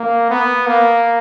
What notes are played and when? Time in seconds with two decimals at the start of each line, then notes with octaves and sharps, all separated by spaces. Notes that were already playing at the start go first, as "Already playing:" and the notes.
Already playing: A#3
0.30 B3
0.66 A#3